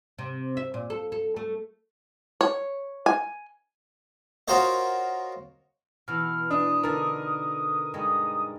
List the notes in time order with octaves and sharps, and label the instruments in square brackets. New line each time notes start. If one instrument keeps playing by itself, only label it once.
[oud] C3
E5
A#2
A4
A4
A3
[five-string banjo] C#5
G#5
[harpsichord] F4 F#4 A#4 C5 C#5 D#5
[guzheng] B2 E3 [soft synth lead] F6
[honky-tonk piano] D4 [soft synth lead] D#6
[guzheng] D3 D#4 A5 [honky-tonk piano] A#4
[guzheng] G2 G#3 D#4